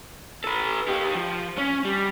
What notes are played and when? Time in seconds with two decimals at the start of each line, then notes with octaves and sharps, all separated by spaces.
0.44 A4 B4
0.88 D#4 G4
1.15 F3
1.57 C#4
1.85 G3